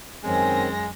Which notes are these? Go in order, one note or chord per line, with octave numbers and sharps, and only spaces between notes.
F#2 D#3 G#3 C4 C#4 G#5 A#6